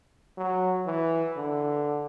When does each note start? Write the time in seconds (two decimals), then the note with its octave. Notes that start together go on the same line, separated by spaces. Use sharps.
0.38 F#3
0.87 E3
1.36 D3